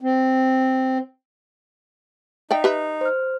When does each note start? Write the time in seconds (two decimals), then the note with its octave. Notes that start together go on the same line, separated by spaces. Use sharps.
0.01 C4
2.51 D#4 D5 E5 G5
2.64 G4 B4 E5
3.01 C5 F6